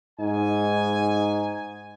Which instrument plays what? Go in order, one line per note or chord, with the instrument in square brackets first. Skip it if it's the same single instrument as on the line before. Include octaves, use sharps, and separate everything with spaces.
[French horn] G#2 [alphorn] D#4 [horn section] G#5